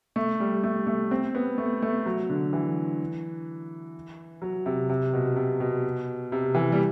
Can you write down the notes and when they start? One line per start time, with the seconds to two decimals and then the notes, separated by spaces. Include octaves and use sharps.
0.16 A3
0.40 G3
0.64 A3
0.87 A3
1.11 C4
1.35 B3
1.58 A3
1.82 A3
2.06 F#3
2.29 D3
2.53 E3
4.42 F#3
4.66 C3
4.89 C3
5.14 B2
5.36 C3
5.60 B2
6.32 C3
6.55 E3
6.72 G3